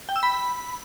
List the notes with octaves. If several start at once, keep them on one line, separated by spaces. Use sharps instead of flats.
G5
E6
B5